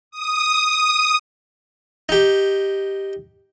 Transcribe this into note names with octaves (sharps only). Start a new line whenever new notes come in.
D#6
D#4 G4